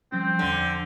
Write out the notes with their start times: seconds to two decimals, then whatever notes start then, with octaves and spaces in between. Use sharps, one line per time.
0.12 F3 G3 C4 C#4
0.39 E2 D3 F3